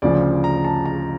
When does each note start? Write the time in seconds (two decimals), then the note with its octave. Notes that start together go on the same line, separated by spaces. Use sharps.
0.02 D2 C#3 F3 D5
0.44 A#5
0.64 A5
0.86 A#5